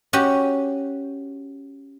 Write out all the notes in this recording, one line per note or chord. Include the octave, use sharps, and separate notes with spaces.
C#4 F#4 G4